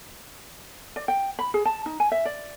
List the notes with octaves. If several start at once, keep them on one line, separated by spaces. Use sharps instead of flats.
D5
G5
B5
G#4
A5
D#4
G#5
E5
D5